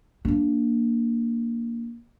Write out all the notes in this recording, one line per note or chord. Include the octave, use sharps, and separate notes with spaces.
A#3 D4